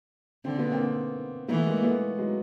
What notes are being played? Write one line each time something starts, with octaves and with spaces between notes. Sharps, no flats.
D3 C4
B3
A#3 C4
E3 A3 B3
G#3 A#3
A3 B3
F#3 G#3